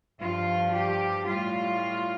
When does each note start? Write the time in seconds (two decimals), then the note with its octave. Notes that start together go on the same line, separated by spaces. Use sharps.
0.21 G2 F3 F4
0.75 G4
1.27 A2 G3 F4